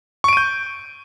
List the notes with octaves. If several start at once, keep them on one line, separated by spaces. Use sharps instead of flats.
C#6 G6 D7 D#7